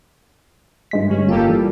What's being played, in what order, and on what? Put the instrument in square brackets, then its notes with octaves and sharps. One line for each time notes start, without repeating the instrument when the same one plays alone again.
[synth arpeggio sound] G2 G#3 B6
[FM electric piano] A2 D3 G3 [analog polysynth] C#4
[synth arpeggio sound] G1 [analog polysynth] A#3 G4 A4 [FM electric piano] F4
[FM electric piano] E3 [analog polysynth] G3